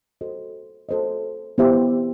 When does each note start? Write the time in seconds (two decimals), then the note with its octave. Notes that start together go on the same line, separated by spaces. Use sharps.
0.21 F#4 A4 C5 D#5
0.89 F#4 A4 C5 D#5
1.58 B3 E4 G4 C5 E5